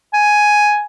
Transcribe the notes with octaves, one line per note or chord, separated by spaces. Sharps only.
G#5